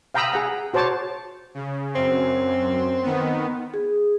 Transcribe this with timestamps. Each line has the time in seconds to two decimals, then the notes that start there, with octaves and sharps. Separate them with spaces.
0.14 F5 G5 A#5 B5 D#6 E6
0.32 G#4 F#5 A#5
0.74 F#4 C5 C#5 A5 D6
1.54 C#3
1.95 F#2 C4
3.03 D#3 B3
3.74 G#4